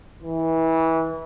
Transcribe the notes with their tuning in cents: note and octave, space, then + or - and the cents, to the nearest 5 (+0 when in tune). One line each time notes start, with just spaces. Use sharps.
E3 -25